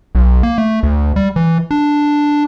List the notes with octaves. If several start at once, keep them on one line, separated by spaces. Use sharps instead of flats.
B1
A#3
A3
D2
G3
E3
D4